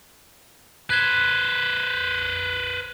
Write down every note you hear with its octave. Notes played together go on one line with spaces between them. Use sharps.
B4 C5 F#6 G#6 G7